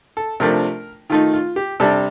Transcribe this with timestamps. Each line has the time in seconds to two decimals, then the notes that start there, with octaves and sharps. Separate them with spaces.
0.17 A4
0.40 C3 F3 A3 D4 A#4
1.10 D#3 A3 D#4 F4
1.33 F4
1.56 G4
1.80 C3 G3 D4 A4